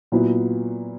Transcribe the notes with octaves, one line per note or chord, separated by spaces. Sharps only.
A#2 F#3 B3 E4